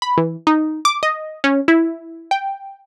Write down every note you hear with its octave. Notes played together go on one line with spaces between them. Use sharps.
B5
E3
D#4
D6
D#5
C#4
E4
G5